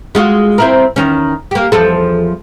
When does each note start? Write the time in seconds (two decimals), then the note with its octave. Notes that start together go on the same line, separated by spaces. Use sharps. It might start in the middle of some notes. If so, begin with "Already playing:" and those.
0.15 G#3 F4 F#4
0.58 C4 E4 A#4
0.96 E2 D#3 C#4
1.51 A#3 G4
1.72 E2 F3 A4